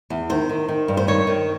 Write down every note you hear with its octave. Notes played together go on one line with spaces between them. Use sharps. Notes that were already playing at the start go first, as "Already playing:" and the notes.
E2
D#3 C5
D#3
D#3
G2
C5
D#3 C#5
D#3